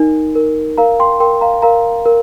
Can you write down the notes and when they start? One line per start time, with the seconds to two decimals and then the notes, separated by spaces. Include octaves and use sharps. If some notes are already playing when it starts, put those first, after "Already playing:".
Already playing: D#4 A#4
0.35 A#4
0.78 A#4 F5 A#5
0.99 G5 C6
1.20 A#4 G5 C6
1.41 F5 A#5
1.62 A#4 F5 A#5
2.06 A#4